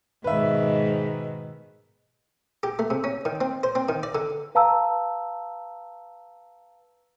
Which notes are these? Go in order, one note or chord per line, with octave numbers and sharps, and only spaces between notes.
G#2 B2 D#3 B4 E5
G4
A3
C3
C#4
D#3
C4
C5
C4
D#3
D5
D3
B4 F5 A5 A#5 E6